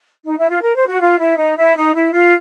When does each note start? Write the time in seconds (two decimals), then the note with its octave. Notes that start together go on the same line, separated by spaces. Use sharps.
0.25 D#4
0.38 E4
0.50 F4
0.62 A#4
0.75 C5
0.87 F#4
1.00 F4
1.19 E4
1.37 D#4
1.56 E4
1.76 D#4
1.94 E4
2.13 F4